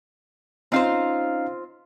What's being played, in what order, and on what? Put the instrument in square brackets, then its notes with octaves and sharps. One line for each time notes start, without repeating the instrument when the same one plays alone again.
[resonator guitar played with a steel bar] C4 F4 C5 [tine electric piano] C#4 D#4 F5